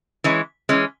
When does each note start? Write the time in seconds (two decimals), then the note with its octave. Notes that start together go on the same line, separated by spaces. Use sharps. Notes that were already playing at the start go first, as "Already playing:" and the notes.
0.24 E3 G#3 C#4
0.69 E3 G#3 C#4